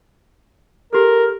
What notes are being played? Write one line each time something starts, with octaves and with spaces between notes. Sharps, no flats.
G4 A4 A#4